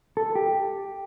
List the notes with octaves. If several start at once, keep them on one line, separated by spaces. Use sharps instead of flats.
A4
G4